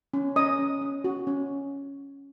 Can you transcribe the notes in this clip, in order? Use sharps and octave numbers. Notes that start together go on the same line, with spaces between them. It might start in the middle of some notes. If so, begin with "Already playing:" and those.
C#4
C#4 D#5 D#6
C#4
C#4
F#4
C#4